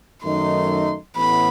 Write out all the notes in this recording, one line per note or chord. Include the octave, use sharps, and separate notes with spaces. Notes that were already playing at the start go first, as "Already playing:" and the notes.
F#2 D#3 A3 D#4 C6
A1 A2 E3 B3 B5